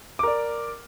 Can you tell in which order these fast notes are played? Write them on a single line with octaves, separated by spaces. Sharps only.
D6 A#4 D5